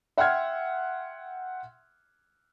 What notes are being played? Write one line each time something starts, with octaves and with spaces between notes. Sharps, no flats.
E5 F#5 G5 C6 F6 G#6